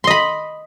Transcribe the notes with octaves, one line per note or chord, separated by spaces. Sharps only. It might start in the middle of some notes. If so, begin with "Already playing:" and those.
D#5 B5 C6